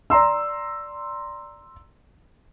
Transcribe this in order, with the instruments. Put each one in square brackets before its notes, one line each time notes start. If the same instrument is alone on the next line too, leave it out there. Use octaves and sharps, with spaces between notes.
[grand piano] D5 A#5 C6 E6